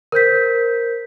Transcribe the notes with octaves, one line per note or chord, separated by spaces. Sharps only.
A#4 C5 G6 B6